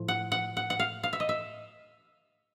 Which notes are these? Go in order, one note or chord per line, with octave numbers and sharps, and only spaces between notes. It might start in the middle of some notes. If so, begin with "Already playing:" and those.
Already playing: A2 F3
F#5
F#5
F#5
F#5
F5
F5
E5
D#5
E5